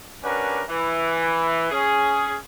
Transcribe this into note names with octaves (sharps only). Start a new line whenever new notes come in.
C#4 D4 F#4 G4 A#4 B4
E3
C#4 G#4